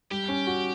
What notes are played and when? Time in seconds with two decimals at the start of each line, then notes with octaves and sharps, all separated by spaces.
0.11 G3 G4
0.29 C#4
0.47 F#4